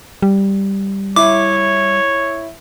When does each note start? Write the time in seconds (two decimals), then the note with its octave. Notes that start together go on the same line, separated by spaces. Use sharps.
0.22 G3
1.16 E4 C#5 D6